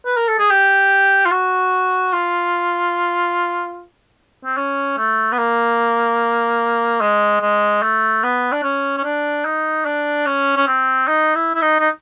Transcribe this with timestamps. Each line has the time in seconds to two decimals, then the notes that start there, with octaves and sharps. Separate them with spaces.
0.05 B4
0.17 A#4
0.28 A4
0.39 G#4
0.50 G4
1.26 F4
1.31 F#4
2.13 F4
4.45 C4
4.57 C#4
4.98 A3
5.32 B3
5.38 A#3
7.01 G#3
7.41 G#3
7.82 A3
8.23 B3
8.52 D4
8.63 C#4
8.97 C#4
9.04 D4
9.45 D#4
9.85 D4
10.26 C#4
10.57 C#4
10.67 C4
11.08 D#4
11.35 E4
11.55 E4
11.61 D#4
11.80 D#4